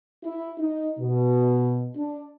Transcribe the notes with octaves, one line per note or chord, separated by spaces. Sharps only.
E4
D#4
B2
D4